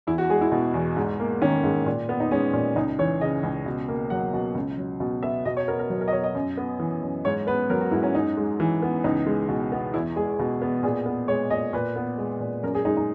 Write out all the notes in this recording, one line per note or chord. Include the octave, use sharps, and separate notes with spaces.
E2 E4
F#4
G#3 G#4
E4
B2
E2
G#2
A#3
D#3 C#4
G#2
A#2
B3
D#4
G#3 C#4
A#2
C#2 D#4
E3 C#5
C#3 D#5
C#2
B2
A#3
F#3 F#5
B2
C#2
F#3
B2
B3 E5
B2 D#5
C#5
B3 A#4
A#4
F#3
A#4
D#5
B2 C#5
D#5
F#2
B3
E3
F#2
G#2 C#5
B3 B4
F#3 A#4
F#4
G#2 E4
C#4
F#2 D#4
G#3
E3
B3
C#2 D#4
G#3
B2
B3
E2 E4
G#3 G#4
B2
B3
A#2 G#4
B3
G#3 C#5
A#2 D#5
A#2 B4
B3
G#3
A#2
F#2 A#4
G#4
G#3 D#4
D#4